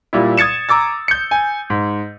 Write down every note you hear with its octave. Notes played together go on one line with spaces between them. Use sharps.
A#2 G3 E4
D#6 G#6 A6 C#7 E7
A#5 D6 E6 A6
G6 C#7
G#5
G#2